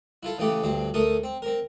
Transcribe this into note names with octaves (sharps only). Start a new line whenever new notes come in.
E4 F4 A4
C#3 E3 A3 G4
D2 G2 C4
D2 A3 A4 A#4 D#6
C4
C4 A#4